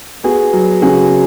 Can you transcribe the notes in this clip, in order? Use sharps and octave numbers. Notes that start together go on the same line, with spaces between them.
B3 F#4 G#4
F#3
C#3 F#4 G#4